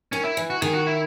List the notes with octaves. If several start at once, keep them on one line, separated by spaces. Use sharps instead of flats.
D#3 C#4
E4
E3
F#4
D#3 G#4
F#4
E4